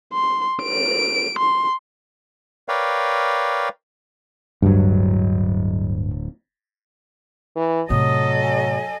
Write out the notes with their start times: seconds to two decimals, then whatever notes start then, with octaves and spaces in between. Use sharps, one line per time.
0.13 C6
0.63 D7
1.39 C6
2.68 A#4 B4 C#5 D5 F5 G5
4.62 D1 G2 F#3
7.55 E3
7.90 A2 C3 F#3 A4 D#5 D#6
8.42 G#5